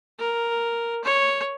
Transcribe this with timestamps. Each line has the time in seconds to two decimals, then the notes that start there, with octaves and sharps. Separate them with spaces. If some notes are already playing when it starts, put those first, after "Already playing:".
0.19 A#4
1.04 C#5